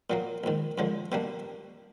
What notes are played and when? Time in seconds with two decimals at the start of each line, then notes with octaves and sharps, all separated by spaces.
0.10 A#2 F#3 A#3
0.44 A#1 G#2 D#3
0.78 F#2 D3 F3 G#3
1.12 B2 G3 A#3 D4